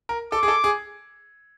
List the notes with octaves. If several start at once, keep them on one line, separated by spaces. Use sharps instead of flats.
A#4
A4 D6
G#4
A4
G#4